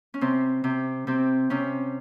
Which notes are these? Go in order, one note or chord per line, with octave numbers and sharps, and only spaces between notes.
C#4
C3 C4
C3
C3 C4
C3 C#4